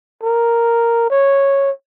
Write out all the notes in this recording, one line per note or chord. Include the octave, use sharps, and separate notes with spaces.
A#4
C#5